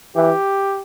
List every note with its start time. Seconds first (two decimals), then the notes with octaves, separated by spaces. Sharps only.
0.16 E3 G4